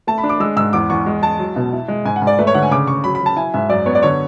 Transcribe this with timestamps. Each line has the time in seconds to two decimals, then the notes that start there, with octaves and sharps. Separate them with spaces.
0.07 A3 A5
0.18 B5
0.23 D4
0.29 D6
0.40 G#3 E6
0.57 G#2 E6
0.73 E2 D6
0.90 E2 C#6
1.06 G#3
1.22 G#3 A5
1.39 F#3
1.56 B2
1.73 E4
1.88 G#3
2.05 G#2 G#5
2.16 F#5
2.22 G#2
2.27 D5
2.39 A3 B4
2.47 C#5
2.54 D3 F#5
2.63 G#5
2.71 C#3 D6
2.87 C#3 C#6
3.04 F#3 B5
3.15 B5
3.20 F#3
3.26 A5
3.37 E4 G#5
3.54 G#2 E5
3.70 F#2 D5
3.86 B3 C#5
3.95 D5
4.03 D3 C#5